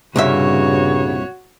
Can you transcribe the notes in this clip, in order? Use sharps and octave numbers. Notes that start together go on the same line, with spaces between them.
C2 G2 A#2 C#3 F#4 C#5 E5